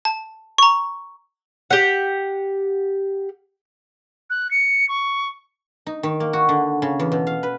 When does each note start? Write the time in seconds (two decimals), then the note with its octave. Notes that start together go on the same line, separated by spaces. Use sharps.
0.05 A5
0.58 A#5 C#6
1.71 G4 F#5
4.30 F#6
4.51 C#7
4.89 C#6
5.86 D#4
6.03 D#3
6.20 A#3
6.33 F#4
6.49 D3
6.82 C#3
7.00 E2
7.12 B2
7.27 F5
7.43 B4